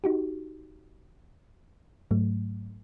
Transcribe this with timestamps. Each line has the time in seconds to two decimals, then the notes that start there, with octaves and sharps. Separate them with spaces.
0.04 D#4 F#4 G4
2.11 G#2 F#3 A3